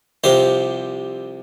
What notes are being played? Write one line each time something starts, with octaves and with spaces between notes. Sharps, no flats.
C2 C3 F3 G4 C5